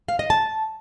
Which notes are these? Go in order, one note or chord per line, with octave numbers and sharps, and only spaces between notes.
F5
D#5
A5